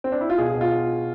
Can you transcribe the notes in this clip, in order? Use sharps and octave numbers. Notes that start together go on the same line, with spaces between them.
C4
D4
E4
F4
B2 G#4
G#4
B2
F4